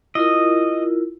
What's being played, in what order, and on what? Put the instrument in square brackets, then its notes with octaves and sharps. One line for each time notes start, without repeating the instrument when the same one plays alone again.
[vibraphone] E4 F4 A#4 [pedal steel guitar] D#5